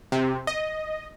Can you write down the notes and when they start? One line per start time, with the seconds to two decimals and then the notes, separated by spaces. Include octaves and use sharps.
0.12 C3
0.47 D#5